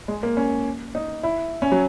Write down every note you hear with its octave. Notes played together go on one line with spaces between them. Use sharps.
G#3
A#3
C#4
D#4
E4
C#4
F#3